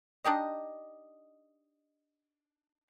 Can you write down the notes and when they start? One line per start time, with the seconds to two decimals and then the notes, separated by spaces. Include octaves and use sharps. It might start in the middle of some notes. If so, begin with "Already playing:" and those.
0.24 D4 D#4 G4 D#5